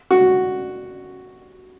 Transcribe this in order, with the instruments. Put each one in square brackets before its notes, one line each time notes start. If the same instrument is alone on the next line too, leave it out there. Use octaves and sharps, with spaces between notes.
[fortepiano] F#4